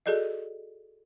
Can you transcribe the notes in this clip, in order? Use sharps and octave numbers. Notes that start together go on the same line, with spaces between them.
F#4 G#4 A4 D5 D#5